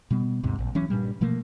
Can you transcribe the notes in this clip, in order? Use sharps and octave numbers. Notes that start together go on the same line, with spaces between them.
B2 G3 B3
D#2 G#2 C3
A#1
E3 F#3 C#4
G2 A#2 G3
B2 F3 A3 A#3